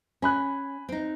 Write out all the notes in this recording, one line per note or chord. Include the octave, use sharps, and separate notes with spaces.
C#4 G#5 B5 F#6
C4 D#4